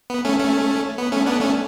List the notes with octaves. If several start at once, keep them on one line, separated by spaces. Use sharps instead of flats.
B3
A3 C#4
A3 C#4
B3
A3 C#4
B3 D4
A3 C#4